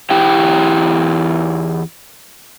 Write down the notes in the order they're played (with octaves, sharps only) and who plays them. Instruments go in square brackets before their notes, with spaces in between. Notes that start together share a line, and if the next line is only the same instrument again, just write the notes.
[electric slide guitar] E2 E4 G4 G5